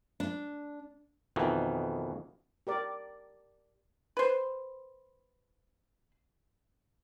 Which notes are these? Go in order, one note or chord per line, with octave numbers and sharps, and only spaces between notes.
D4
F2 B2 D#3 E3
G4 A#4 D5
B4 C5